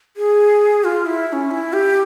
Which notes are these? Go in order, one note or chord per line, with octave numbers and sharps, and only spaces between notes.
G#4
F4
E4
E4
C#4
E4
G4